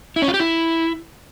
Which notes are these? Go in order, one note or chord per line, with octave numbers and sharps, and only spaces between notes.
E4
C#4
F4
G4
E4